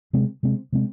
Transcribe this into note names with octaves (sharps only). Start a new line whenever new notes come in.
C3 G#3 C4
C3 G#3 C4
C3 G#3 C4